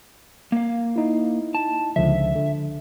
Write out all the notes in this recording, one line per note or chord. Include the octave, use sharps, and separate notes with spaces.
A#3 F5
D#4 E4
A5
C#2 D3 F3 E5
D3